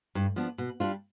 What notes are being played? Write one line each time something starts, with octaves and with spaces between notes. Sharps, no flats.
G2
F3 B3 D4
B2
G3 D4 F4